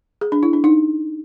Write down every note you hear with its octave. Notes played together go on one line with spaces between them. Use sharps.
G#4
D4
E4
D4
D#4